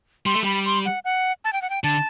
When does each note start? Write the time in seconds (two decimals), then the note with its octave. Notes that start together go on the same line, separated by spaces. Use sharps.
0.26 G3 C6
0.34 A3
0.42 G3 B5
0.66 C6
0.85 F#5
1.05 F#5
1.44 A5
1.53 G5
1.62 F#5
1.70 G5
1.83 D3 A5